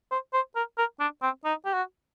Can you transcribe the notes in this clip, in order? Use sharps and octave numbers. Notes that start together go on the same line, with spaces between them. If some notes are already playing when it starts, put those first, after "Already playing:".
C5
C5
A#4
A#4
D4
C4
D#4
G4
F#4